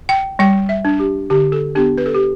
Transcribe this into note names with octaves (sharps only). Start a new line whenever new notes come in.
G5
G3 G5
E5
D4
G4
D3 G4
A4
B3 D4 G4
B4
A4
G4